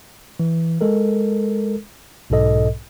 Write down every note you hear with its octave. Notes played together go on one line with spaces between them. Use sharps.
E3
G#3 A4 A#4
B1 G#2 B2 A4 D#5